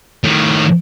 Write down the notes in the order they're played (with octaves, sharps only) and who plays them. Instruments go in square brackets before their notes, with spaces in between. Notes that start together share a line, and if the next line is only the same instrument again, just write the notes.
[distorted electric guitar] A2 D#3